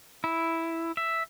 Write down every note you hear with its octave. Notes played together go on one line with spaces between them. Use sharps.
E4
E5